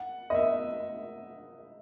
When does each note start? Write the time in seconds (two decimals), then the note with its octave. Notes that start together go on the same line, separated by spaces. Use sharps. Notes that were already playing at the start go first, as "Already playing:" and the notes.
Already playing: F#5
0.30 D#5
0.35 E5